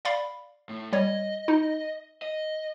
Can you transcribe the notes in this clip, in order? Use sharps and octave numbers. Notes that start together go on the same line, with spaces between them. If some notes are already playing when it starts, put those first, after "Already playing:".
D5 F5 B5
A2
G3 C#5 D#5
D#4
D#5